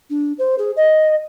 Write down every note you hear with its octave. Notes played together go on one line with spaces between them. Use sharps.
D4
C5
G#4
D#5